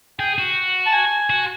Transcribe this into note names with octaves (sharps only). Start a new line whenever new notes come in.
G#4 G5
F#4
A5
G#5
F#4